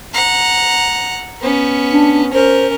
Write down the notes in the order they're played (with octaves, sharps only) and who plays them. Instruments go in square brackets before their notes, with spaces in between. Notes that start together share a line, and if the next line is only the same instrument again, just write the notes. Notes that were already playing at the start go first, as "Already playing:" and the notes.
[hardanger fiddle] F#5 A#5
B3 C#4
[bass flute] D4
[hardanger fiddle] C#4 A#4 [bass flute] C5